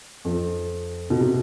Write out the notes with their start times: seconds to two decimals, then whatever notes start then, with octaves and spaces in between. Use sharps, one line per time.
0.25 F2
1.10 B2
1.20 C3